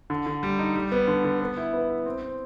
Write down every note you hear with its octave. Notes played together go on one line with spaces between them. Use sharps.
D3
D3
G3
D#4
G3
B3
D3
D3
B3
E4
B3
E4
C4
C4